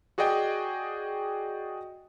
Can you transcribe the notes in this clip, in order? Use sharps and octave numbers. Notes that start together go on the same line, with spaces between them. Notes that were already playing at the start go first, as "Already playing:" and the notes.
F#4 G#4 D5 D#5 G5